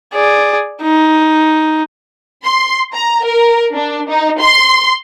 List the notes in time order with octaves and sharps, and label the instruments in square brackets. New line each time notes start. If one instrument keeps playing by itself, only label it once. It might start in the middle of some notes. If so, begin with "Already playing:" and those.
[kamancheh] G#4 D5
D#4
[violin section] C6
A#5
A#4
D4
D#4
C6